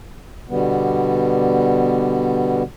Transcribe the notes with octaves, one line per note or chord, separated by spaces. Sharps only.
B2 D3 G3 B3